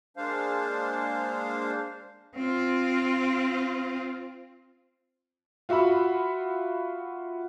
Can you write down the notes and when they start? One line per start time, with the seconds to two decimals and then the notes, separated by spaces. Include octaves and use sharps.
0.17 G#3 A#3 D4 C5 F5
2.35 C4 F4
5.69 F4 F#4 E5 F#5 B5